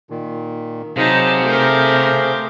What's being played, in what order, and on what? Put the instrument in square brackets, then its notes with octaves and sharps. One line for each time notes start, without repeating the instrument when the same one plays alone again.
[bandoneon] A#2 D#3
[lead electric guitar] C3 [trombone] F#3 [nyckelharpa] D#4 A5 [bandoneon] G#4 C5 F5
[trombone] A3 [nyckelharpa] G4 A#4